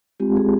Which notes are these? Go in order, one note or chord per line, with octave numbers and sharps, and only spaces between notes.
G#3 C4 F4 G4
G#4